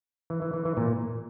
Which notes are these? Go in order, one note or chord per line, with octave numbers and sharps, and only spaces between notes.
E3
E3
E3
E3
A#2